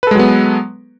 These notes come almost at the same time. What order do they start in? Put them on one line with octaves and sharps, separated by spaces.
B4 A4 G#3 F#3 B3